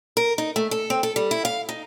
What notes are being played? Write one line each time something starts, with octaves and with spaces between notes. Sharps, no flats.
A#4
D#4
A3
A4
C4
A4
G3
E4
F5
D#4